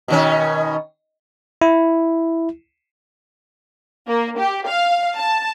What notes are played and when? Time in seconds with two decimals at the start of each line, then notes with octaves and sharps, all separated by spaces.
0.08 B2 D#3 C#4
1.62 E4
4.07 A#3
4.39 G4
4.68 F5
5.18 A5